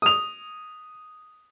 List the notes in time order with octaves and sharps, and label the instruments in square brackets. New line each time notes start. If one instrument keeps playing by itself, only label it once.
[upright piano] D#6 F7